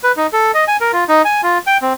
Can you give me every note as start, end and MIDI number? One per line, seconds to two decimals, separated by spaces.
0.04 0.12 71
0.17 0.27 63
0.33 0.52 69
0.54 0.64 75
0.68 0.77 80
0.81 0.92 70
0.93 1.04 65
1.09 1.22 63
1.25 1.41 80
1.43 1.58 65
1.67 1.77 79
1.82 1.93 60